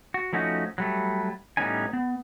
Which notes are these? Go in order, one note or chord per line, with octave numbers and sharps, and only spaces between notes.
F#4
F3 A3 C#4 D#4 F#4
F#3 G3 A3
A2 G3 B3 C#4 D#4 G#5
B3